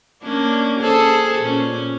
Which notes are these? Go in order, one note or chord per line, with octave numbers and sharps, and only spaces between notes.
A#3 C#4 D4
G#4 A4 C5
A#2 C#4